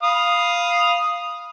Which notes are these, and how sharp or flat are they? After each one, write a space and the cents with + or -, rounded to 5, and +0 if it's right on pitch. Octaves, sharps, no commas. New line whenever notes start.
F5 +0 B5 -10 D#6 +0